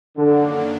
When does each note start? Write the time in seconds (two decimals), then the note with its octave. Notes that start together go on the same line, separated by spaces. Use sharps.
0.16 F#2 D3 D#3 F#3 A#3 D4